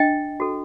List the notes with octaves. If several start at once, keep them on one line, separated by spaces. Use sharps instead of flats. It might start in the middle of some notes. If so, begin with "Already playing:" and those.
Already playing: D4 D#5 G5
F#4 A4